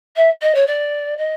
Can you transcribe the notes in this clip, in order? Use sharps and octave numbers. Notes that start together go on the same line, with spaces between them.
E5
D#5
C#5
D5
D#5